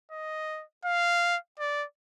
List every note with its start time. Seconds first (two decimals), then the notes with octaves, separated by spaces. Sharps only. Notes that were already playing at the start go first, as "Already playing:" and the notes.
0.12 D#5
0.85 F5
1.59 D5